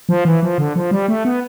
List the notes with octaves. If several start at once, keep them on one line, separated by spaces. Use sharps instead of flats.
F3
E3
F3
D3
F3
G3
A3
B3